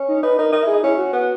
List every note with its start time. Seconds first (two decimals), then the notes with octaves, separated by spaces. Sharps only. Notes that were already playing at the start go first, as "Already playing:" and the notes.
Already playing: C#4
0.08 D#4
0.23 D#4 B4
0.38 D#4 A#4
0.52 D#4 A#4
0.63 E4 G#4
0.74 D#4
0.83 C#4 E4
0.98 F#4
1.13 B3